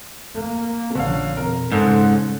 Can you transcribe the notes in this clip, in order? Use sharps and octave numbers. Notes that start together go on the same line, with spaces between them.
A#3
A#1 D3 F3 C#4 F5
F2 B2 A#4
B1 G#2 C#3 A4 F#6